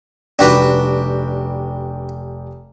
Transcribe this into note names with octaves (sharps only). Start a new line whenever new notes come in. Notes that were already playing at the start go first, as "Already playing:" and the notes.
F1 G3 D4 F#4 B4 G5